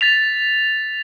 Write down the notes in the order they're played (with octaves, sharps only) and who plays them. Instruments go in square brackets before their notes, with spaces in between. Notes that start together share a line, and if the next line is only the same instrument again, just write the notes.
[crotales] A6 B6 F7